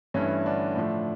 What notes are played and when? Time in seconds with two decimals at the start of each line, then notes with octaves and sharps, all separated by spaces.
0.14 G2 E3 A3 C#4
0.46 D3 D4
0.76 A2 F3 A3